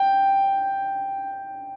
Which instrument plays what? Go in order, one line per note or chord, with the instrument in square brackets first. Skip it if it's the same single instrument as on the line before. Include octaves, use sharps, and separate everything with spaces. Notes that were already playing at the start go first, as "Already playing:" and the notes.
Already playing: [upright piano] G5